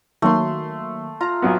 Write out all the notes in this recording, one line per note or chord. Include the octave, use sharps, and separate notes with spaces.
D#3 F#3 A3 A#3 C6
F4 A#5
B1 F#3 B3